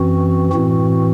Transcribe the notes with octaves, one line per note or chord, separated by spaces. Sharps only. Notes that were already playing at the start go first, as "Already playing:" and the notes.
Already playing: F#2 E3 C4 F#4
A2 E3 C4 F#4